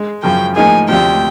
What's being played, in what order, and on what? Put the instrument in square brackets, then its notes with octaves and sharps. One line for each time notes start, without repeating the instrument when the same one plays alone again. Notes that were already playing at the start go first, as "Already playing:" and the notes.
Already playing: [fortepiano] G#3
[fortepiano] F#2 C#3 F3 [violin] G5
[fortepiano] A2 F3 A#3 D#4 G#4 [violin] G#5
[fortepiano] D2 C3 F3 [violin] G5